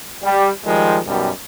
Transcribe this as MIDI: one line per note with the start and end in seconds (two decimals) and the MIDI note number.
0.24 0.51 55
0.65 1.00 51
0.65 1.00 53
0.65 1.00 55
0.65 1.00 56
1.07 1.30 42
1.07 1.30 47
1.07 1.30 51
1.07 1.30 55